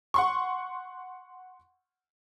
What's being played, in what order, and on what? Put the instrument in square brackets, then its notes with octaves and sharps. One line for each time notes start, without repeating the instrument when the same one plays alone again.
[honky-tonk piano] F#5 C6 C#6